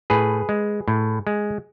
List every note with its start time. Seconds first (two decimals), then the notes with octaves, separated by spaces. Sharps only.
0.10 A2 G#4 B4
0.49 G#3
0.88 A2
1.27 G#3